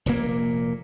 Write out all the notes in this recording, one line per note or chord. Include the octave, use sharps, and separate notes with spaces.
F1 A#2 A#3